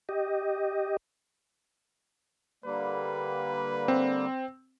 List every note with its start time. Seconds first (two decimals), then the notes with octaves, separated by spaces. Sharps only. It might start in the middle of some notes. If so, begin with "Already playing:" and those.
0.09 G4 D#5
2.64 D3 G3 A#3 B4
3.88 C4